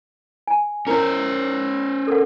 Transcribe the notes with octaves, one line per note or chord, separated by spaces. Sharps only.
G#5
C#4 E4 A#4 C5
A4 A#4 F#5